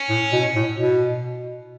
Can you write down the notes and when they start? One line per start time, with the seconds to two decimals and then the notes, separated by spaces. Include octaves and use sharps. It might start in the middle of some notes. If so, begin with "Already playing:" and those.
Already playing: C#4
0.09 A2
0.32 B2
0.55 A2
0.78 B2